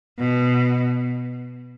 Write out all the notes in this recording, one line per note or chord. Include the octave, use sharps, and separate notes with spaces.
B2